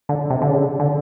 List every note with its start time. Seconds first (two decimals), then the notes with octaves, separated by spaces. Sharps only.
0.09 D3
0.30 C3
0.42 D3
0.50 C#3
0.79 D3